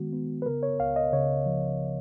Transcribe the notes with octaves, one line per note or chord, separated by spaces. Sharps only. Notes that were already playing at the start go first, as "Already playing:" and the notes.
Already playing: D#3 G#3 B3 F#4
B3
B4
C#3 A#4
C#5
C#2 F5
D#5
C#3 C#5
F3